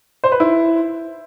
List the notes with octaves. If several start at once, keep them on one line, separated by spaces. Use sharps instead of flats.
C5
B4
E4